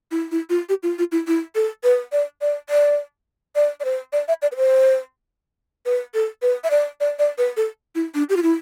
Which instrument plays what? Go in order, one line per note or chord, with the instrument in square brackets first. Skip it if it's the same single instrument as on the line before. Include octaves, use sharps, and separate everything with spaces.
[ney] E4
E4
F4
G4
F4
F4
E4
E4
A4
B4
D5
D5
D5
D5
D5
C5
D5
E5
D5
B4
C5
B4
A4
B4
E5
D5
D5
D5
B4
A4
E4
D4
G4
F4
E4